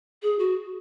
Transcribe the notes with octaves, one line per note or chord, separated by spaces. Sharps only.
G#4
F#4